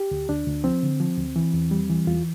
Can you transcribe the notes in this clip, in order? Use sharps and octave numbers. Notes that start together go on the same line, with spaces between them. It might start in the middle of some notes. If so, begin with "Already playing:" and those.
Already playing: G4
D2
D2 D4
D2
F3 C4
D3
F3
D2
E3
E2
G3
E3
E2 F4